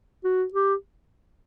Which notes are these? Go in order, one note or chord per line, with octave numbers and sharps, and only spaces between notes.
F#4
G4